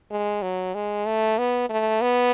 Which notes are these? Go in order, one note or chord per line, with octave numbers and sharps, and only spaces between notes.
G#3
F#3
G#3
A3
B3
A3
B3